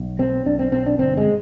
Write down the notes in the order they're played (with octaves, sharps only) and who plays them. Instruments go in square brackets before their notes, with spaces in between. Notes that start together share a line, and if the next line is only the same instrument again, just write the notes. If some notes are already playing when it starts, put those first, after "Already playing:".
Already playing: [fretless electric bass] B1
B2 C4
B1 D4
C4
B2 C4
D4
G1 C4
G#3